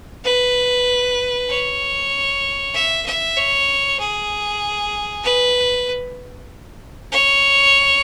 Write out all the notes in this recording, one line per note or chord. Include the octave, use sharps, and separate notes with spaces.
B4
C#5
E5
E5
C#5
G#4
B4
C#5